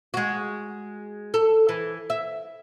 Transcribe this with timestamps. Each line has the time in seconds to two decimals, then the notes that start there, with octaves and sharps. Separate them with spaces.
0.14 G#3 F#4
1.34 A4
1.69 E3
2.10 E5